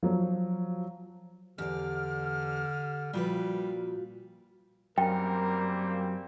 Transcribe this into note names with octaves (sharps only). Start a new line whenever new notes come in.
F3 F#3
E2 D3 G4 D5 F6
A#2 F3 G3 F4 F#4 B4
F#2 G3 A#3 C4 A#4 G5